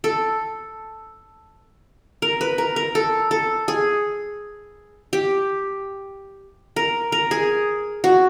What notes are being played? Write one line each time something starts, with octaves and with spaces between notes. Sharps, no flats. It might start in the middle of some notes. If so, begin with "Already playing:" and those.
A4
A#4
B4
A#4
A#4
A4
A4
G#4
G4
A#4
A#4
G#4
F#4